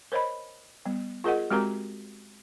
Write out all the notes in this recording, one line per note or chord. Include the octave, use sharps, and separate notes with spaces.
A#4 C5 C#5 D#5 B5
G3 B3
F4 G#4 A#4 D#5 F#5
G#3 C4 F#4 G4 A#4 A#5